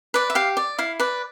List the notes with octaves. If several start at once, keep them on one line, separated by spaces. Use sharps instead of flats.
B4 D5
E5
G4 F5
D5
E4 F5
B4 D5